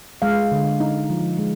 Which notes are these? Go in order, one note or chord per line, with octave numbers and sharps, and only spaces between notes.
G#3 F5
D3
D#4
F3
G#3